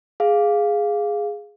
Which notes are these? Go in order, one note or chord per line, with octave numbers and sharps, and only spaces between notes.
G#4 F5